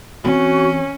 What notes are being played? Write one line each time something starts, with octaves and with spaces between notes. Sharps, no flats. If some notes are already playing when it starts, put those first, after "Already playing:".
E3 C4 C#4 F#4